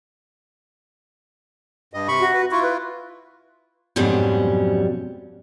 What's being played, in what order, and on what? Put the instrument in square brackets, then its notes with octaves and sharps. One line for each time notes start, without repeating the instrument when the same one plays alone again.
[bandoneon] G2 D#5
C3 B5 C#6
[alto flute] F#4
[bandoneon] B4
[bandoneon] E4 F4 [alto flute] C#6
[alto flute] B4
[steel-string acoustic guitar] F2 G#2 B2 F#3 G3 C#4